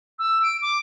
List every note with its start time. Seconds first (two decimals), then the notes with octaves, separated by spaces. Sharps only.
0.18 E6
0.43 D7
0.61 D6